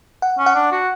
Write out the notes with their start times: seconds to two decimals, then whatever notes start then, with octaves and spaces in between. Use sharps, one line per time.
0.22 F#5
0.38 C#4
0.46 F#5
0.55 D4
0.72 F#4